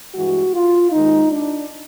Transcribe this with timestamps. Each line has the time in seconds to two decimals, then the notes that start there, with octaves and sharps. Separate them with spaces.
0.14 G2 E3 G#3 F#4
0.54 F4
0.92 D#2 D#3 G#3 D#4
1.32 D4